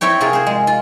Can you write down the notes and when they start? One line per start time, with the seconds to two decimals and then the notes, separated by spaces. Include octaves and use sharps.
0.01 C4 E4 C#5 G5
0.21 C3 F4 G#4 A#4
0.33 G#4 C5
0.47 G#3
0.67 F4